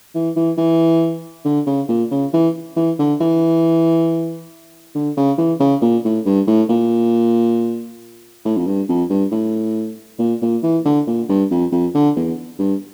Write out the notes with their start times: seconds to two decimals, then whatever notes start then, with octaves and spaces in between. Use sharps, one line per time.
0.15 E3
0.36 E3
0.58 E3
1.45 D3
1.67 C#3
1.89 A#2
2.11 C#3
2.33 E3
2.76 E3
2.99 D3
3.20 E3
4.95 D3
5.17 C#3
5.38 E3
5.60 C#3
5.82 A#2
6.05 A2
6.26 G2
6.47 A2
6.69 A#2
8.45 A2
8.57 F2
8.66 G2
8.89 F2
9.10 G2
9.31 A2
10.19 A#2
10.42 A#2
10.63 E3
10.85 D3
11.07 A#2
11.29 G2
11.51 F2
11.72 F2
11.94 D3
12.17 E2
12.59 G2